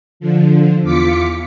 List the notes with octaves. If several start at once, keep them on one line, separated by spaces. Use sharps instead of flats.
D3 F3
E2 F4 D6 B6 C#7